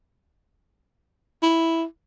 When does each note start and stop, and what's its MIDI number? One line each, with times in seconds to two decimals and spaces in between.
1.42 1.84 64